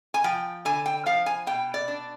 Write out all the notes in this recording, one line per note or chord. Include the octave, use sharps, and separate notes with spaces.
G#5
F3 G5
D3 G#5
G5
F3 F5
G#5
B2 G5
D5
D4